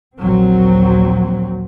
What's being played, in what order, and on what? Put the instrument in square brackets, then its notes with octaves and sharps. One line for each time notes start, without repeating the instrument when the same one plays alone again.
[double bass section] A#1 D#2 F#3 C4